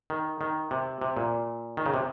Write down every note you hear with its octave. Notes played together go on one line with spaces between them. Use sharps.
D#3
D#3
C3
C3
A#2
D#3
C#3
C3